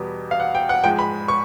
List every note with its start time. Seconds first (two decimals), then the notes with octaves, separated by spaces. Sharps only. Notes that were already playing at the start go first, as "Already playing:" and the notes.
Already playing: E2 B2 G3 B3
0.31 F5
0.40 F#5
0.55 G5
0.69 F#5
0.84 G#2 F3 G#3 G5
0.99 B5
1.28 C#6